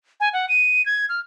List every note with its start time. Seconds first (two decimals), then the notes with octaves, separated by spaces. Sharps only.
0.20 G#5
0.33 F#5
0.49 D#7
0.86 G#6
1.09 F6